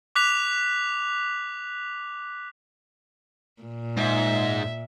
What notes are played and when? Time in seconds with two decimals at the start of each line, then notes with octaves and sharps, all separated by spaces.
0.16 D6 F#6 B6 F7
3.62 A#2
3.97 G#2 E5